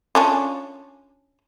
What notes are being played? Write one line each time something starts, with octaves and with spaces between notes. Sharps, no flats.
C#4 D4 F4